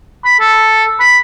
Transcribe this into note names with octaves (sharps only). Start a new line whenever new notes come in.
B5
A4
B5